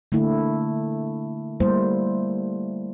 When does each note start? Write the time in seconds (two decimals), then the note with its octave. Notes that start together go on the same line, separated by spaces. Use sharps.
0.12 D3 A3 A#3 E4
1.60 G3 A3 A#3 E4 C5